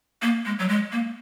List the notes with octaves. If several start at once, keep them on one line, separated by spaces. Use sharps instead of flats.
A#3
G#3
F#3
G#3
A#3